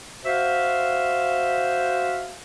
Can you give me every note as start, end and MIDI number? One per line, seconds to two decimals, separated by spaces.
0.25 2.36 66
0.25 2.36 72
0.25 2.36 76
0.25 2.36 77